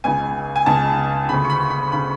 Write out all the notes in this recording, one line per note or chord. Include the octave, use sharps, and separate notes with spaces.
C#2 C#3 G#5
G#5
C#2 C#3 A5
D2 C#3 B5
C#6
B5
B5
C#3 B5